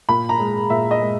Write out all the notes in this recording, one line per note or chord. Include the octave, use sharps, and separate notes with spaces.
A#2 B5
A#5
G#3
A#2 E5
D#5
G#3